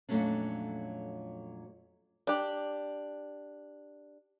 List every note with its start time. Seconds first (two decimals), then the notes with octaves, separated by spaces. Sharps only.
0.09 F2 A#2 F#3 A3 C#4 D4
2.27 D4 G4